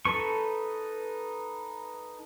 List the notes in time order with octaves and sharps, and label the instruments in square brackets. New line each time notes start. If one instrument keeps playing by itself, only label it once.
[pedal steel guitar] D#4 A4 B4 C#6